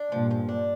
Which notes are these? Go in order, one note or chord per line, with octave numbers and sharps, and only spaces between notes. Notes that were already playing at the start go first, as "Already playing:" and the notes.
Already playing: D4
G2 A#2 F3
F3
D4